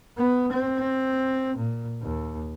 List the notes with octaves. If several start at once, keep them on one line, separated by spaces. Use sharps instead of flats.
B3
C4
A#2
D#2